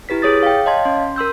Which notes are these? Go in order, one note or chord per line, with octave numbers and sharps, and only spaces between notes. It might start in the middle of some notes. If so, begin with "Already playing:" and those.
E4 G4 B4 B6
G#4 C#5 D#6 A6
F5 G5
C#5 D#5 F5 A5 C6 G#6
C#4 C6
A#4 C6 E6 G6